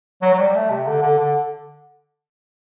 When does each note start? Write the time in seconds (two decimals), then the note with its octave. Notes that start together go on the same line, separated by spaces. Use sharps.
0.22 F#3
0.33 F#3
0.39 G3
0.50 G3
0.55 A3
0.70 C3
0.87 D3
1.02 D3
1.19 D3